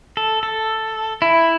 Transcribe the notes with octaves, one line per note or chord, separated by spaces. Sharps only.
A4
A4
E4